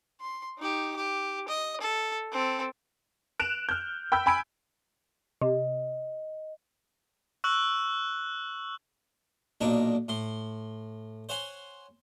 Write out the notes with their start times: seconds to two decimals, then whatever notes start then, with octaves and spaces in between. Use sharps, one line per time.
0.21 C6
0.58 D#4 G4
0.96 G4
1.48 D#5
1.81 A4
2.32 C4 A4
3.40 F#6 D7 E7 F7
3.69 F6 G6
4.12 G5 B5 E6 G6
4.26 G#5 B5 G#6 D7
5.42 C3 D#5
7.44 C#6 E6 F#6 F#7
9.61 B1 A#2 A#3 D4 D#4 C#6
10.08 A2 C6
11.29 C5 C#5 F#5 G#5 C6